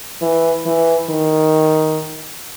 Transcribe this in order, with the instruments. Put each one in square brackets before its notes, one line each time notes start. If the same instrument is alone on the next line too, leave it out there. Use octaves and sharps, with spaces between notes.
[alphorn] E3
E3
D#3